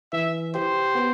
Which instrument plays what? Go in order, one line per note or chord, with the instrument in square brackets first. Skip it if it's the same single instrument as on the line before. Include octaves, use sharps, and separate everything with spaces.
[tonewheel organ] E3 [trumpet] E5
[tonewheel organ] G4 [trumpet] C5
[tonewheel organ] B3